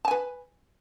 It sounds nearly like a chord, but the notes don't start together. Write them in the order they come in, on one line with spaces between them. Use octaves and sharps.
A5 G#5 B4